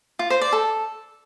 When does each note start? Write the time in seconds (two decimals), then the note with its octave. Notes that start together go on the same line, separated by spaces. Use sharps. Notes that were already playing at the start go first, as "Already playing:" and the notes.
0.19 F4
0.30 C5
0.41 D5
0.53 A4